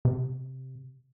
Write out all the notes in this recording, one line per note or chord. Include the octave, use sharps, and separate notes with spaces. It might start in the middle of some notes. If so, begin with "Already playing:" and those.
C3